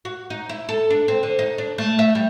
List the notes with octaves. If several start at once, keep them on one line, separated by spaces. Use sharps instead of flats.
F#4
D#4
E4
A4
D4
C4
D3
D#4
D4
A3
E5
G3